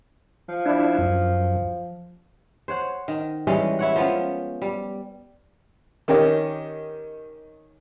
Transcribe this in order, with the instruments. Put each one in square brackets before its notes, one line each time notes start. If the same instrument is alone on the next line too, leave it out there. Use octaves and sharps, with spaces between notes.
[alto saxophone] F3
[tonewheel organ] D4 E4
F#2
[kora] C5 C#5 F#5
D#3
E3 G3 G#3 C#4
E4 C#5 F#5
F3 B3 C#4
G3
[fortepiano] D#3 C#4 G4 D#5